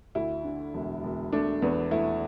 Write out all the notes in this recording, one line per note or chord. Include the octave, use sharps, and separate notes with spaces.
D2 E4
D3
E1
E1
A3 D4
E2 B3
A3 E4